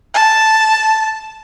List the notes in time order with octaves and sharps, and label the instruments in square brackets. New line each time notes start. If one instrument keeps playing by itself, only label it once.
[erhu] A5